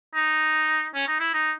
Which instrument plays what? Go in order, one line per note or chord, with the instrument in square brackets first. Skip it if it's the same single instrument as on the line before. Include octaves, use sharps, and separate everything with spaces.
[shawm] D#4
C#4
D#4
E4
D#4